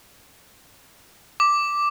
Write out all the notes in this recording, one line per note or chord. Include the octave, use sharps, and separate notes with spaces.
D6